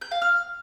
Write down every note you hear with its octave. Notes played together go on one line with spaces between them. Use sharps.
G6
F5
F6